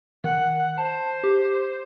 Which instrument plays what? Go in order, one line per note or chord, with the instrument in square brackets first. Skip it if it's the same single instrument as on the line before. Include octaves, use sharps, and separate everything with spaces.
[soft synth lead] D#3 [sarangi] F#5
[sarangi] C5 [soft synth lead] A5
[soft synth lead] G4